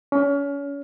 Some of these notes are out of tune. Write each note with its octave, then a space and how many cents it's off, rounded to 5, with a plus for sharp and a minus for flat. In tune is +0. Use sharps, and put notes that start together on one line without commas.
C#4 +30